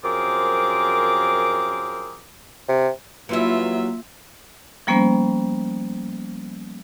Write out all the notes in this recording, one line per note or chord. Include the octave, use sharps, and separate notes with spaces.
F#2 F3 C4 G#4 A#4 D6
C3
E3 F#3 G3 A#3 E4 F4 E5
F3 G3 A#3 B3 C#4 C5